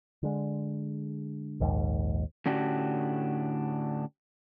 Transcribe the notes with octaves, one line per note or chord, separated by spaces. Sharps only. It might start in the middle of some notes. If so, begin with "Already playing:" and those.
D3 G#3
A#1 D#2 G#2
A2 D3 C#4 D4 F#4 G4